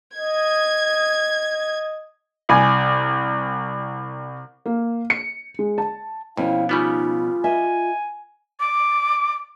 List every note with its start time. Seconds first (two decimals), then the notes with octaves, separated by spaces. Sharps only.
0.16 D#5 G#6
2.49 C2 G#5
4.66 A#3
5.10 C#7
5.59 G#3
5.78 A5
6.37 F2 B2 F3 C#4 E4 F5
6.69 C#3 G3 B3 D#4 F4
7.44 D#5 E5 G#5
8.60 D6